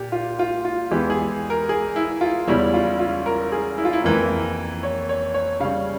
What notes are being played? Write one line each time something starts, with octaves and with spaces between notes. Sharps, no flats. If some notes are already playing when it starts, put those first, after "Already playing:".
Already playing: A#2 G4
F4
F4
F4
E2 E3 G#3 G4
G#4
A#4
G#4
E4
F4
E2 C#3 G3 C#4 E4
F4
F4
A#4
G#4
E4
F4
E4
F2 E3 A#3 A#4
C#5
C#5
C#5
C#3 G3 C#4 F5